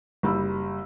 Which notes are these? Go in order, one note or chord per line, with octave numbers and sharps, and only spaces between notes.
F#1 G3 B5 E6